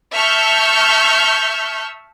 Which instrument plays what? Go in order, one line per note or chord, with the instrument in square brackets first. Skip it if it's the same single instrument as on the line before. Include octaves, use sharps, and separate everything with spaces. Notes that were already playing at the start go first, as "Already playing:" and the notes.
[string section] E5 A5 C#6 E6 F6 G6